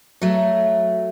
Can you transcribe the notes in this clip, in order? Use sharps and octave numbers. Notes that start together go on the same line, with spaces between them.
F#3 A3